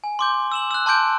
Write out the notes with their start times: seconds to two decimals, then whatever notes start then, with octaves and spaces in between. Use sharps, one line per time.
0.04 G#5
0.19 C6 D6 G6
0.52 E6 E7 F#7
0.71 E6 F#6
0.86 A5 C6 D6 G6 D7